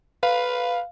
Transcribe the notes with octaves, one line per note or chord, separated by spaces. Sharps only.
B4 F5